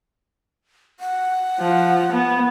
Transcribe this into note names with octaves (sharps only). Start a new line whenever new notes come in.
F#5
F3
B3